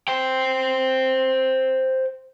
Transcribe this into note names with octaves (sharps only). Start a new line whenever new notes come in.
C5 G5